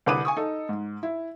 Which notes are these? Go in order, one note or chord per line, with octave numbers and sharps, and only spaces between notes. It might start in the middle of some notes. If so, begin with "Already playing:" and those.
C2 D3 B4 D6 D#6 D#7
G#5 C#6 D#6
D#4 A4
G#2
E4